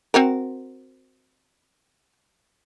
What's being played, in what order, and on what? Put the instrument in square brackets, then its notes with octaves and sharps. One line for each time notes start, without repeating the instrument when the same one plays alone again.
[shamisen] C4 F#4 A#4